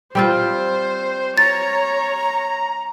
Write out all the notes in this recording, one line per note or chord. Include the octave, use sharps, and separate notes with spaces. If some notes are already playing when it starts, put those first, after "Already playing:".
G3 C4 F4 C5
C#5 A#5 A6